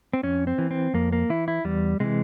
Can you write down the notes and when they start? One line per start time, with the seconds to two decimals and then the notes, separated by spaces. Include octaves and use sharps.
0.13 C4
0.23 F2 C#4
0.47 C4
0.58 E3
0.71 C4
0.94 F2 A#3
1.13 A#3
1.30 E3 E4
1.48 E4
1.65 E2 G3
2.00 C3 E3 G#3